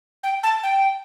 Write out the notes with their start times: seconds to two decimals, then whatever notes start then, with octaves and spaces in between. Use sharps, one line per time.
0.23 G5
0.43 A5
0.63 G5